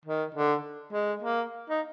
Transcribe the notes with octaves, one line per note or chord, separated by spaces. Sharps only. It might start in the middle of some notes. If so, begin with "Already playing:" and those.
D#3
D3
G#3
A#3
D#4